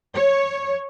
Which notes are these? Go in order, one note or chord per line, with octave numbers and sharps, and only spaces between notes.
C#5